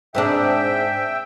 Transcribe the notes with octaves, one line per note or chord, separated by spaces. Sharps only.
G#2 C4 D4 E5 G5